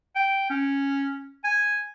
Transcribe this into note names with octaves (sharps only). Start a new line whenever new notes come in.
G5
C#4
G#5